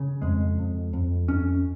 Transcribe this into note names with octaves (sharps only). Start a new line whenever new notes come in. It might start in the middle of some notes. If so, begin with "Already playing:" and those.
Already playing: C#3
F2 G#3
F2
F2
F2 C#4